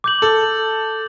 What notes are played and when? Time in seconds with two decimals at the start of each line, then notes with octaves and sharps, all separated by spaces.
0.04 D6 G6 F#7
0.22 A4